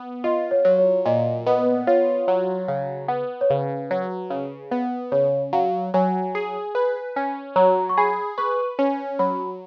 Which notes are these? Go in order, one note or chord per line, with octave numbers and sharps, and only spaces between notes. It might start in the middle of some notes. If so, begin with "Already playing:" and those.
Already playing: B3
F4 D#5
C#5
F#3
C#5
A#2 D#5
B3 D#5
F4 C#5
F#3
C#3
B3
C#5
C#3 B4
F#3
C#3
B3
C#3 C#5
F#3 F5
F#3 G#5
G#4
B4
C#4
F#3 A#5
C#6
G#4 B5
B4 C#6
C#4
F#3 B5